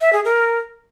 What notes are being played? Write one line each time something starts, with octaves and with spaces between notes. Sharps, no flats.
E5
G#4
A#4